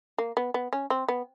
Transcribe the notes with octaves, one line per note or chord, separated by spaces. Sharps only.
A#3
B3
B3
C#4
C4
B3